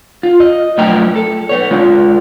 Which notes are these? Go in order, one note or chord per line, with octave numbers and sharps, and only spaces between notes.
F4
D#5
F#2 F3 A3 D4 G5 A#5
A4
B3 C#5
G#3 D4 F4